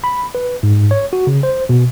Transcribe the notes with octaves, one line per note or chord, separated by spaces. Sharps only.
B5
B4
G#2
C#5
F#4
C#3
C5
B2